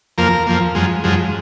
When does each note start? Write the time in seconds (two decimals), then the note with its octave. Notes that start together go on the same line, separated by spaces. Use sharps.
0.18 F2 F3 A#3 A#4
0.47 F2 F3 A#3
0.75 F#2 F3 G#3
1.04 F#2 F3 G#3